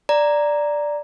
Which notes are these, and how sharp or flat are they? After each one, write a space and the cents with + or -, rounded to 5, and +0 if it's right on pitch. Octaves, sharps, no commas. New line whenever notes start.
D5 +0 A#5 +0